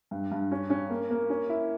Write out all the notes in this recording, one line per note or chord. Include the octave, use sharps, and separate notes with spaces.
G2
G2
C#4
C#4
A#3
A#3
C#4
E4